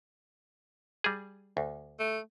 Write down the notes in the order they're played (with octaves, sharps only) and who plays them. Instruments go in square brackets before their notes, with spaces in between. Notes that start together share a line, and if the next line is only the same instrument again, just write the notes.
[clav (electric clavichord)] G3 G#4
D2
[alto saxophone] A3